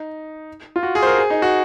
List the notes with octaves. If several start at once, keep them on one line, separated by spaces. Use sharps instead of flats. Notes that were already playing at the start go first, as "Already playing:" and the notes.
Already playing: D#4
F4
F#4
G#4
C5
A#4
G#4
D#4
F#4